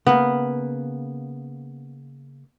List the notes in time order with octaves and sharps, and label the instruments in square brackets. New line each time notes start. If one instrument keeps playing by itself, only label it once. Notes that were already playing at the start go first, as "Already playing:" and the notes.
[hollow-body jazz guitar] C#3 A#3 [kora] B3